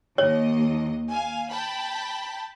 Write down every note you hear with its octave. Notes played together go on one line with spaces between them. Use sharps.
D#2 C#5 D#5
F5 G#5
G5 A5 B5